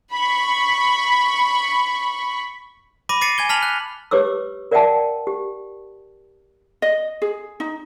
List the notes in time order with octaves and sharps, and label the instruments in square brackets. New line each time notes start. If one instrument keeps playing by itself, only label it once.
[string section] B5 C#6
[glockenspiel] B5 D6 A#6 D#7
D6 A6 A#6 C7 C#7 D#7
G#5 G#6 G7
A5 F6 B6 F7 F#7
F#6
[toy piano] G4 B4 C#5 D6 E6
A#4 D5 E5 F#5 G5 A5
G4
[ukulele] D#5
G#4
D#4